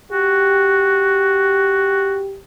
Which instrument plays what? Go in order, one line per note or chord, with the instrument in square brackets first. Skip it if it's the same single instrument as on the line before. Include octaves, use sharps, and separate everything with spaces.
[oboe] F#4 [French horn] G4